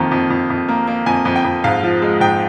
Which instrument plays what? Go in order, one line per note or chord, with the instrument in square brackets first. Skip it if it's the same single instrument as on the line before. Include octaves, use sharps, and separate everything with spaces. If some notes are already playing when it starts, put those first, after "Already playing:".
Already playing: [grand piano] F2 D#3 A#3
F2
F2
F2
A#3
A#3
F2 G#5
F2
G5
F2
G#2 F5
F3
G#3
G#2 G5